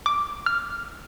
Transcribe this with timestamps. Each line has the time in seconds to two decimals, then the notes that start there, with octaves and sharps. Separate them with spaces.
0.06 D6
0.46 F6